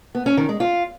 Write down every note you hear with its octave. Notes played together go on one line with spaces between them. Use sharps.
B3
C#4
D#3
G#3
F4